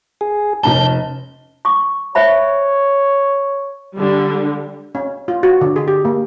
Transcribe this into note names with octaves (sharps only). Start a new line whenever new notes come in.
G#4
F1 C#4 A5 G6
C#6 D6
C5 C#5 E5 B5
D3 G3
C#4
F4
F#4
D3
G#4
G4
A#3